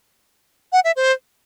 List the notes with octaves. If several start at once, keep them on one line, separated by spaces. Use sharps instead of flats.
F#5
E5
C5